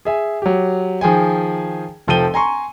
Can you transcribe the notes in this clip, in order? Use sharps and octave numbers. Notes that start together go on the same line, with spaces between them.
G#4 E5 G#5
F#3 G4
D#3 F3 G#4 G5 G#5
F1 F3 A4 G5 D#7 G7
G#5 A#5 C6 C#6